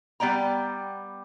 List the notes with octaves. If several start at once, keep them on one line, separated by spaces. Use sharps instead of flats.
G3 B3 D5 G5 A#5